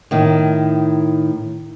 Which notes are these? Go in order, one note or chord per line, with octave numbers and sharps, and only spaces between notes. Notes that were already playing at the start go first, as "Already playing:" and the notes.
A2 D#3